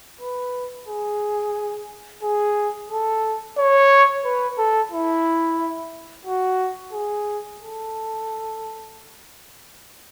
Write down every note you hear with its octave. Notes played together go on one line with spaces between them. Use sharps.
B4
G#4
G#4
A4
C#5
B4
A4
E4
F#4
G#4
A4